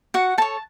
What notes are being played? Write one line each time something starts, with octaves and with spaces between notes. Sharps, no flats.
F#4 F#5
A4 C#5 A5